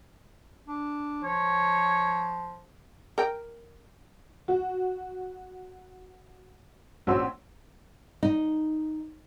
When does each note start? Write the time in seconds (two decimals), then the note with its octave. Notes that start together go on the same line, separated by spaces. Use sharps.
0.68 D4
1.24 F3 C#5
3.18 A#4 G5
4.48 F#4
7.07 A#1 C#4 F#4 C5 C6 E6
8.23 D#4